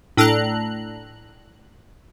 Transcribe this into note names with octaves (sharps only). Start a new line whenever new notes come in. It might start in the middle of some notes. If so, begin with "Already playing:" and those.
A2 D4 A4 A#5 F#6